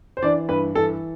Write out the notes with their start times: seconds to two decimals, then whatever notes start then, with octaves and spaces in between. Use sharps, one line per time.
0.17 C5
0.22 E3 D4 D5
0.49 G2 B4
0.75 E3 A4